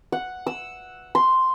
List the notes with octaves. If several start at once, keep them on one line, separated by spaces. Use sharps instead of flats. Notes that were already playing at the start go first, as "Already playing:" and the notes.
F#5
E6
C6